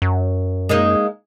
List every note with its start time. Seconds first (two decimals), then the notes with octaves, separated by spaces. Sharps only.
0.02 F#2
0.69 G#3 A#3 D#4